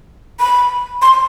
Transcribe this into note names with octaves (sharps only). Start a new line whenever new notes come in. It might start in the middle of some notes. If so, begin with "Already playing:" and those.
B5
C6